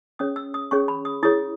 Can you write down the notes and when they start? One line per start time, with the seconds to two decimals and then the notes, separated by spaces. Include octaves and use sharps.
0.19 C#4 G#4 C#5 D#6
0.36 E6
0.54 D#6
0.71 C#4 G#4 C#5 C#6
0.88 B5
1.05 D#6
1.23 E4 G#4 C#5 D#6